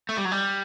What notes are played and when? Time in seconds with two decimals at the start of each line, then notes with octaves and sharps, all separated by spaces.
0.09 A3
0.17 G3
0.25 F#3
0.32 G3